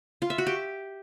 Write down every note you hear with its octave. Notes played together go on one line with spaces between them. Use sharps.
F4
E5
F#4
G4